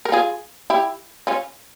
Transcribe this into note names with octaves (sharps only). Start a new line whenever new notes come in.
A#4
F4 G#4
E4 G4
C#4 F4